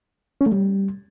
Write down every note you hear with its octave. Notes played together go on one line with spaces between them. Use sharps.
C#4
A3
G3